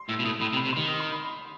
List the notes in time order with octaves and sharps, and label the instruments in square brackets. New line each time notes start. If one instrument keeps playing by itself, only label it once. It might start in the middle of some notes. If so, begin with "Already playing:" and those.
Already playing: [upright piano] C6
[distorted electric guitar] A2 [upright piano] E6
[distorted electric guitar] B2
[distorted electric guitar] A2 [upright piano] D#6
[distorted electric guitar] A2 [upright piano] B5
[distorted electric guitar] C3
[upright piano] B5
[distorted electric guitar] C3
[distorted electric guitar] D#3 [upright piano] C6
[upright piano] D#6
C6
B5
B5